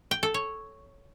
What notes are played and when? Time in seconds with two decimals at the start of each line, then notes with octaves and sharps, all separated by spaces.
0.11 G5
0.23 A4
0.34 C#5